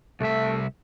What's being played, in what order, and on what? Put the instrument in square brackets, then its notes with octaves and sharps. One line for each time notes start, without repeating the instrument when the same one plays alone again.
[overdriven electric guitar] C2 E5 [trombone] A3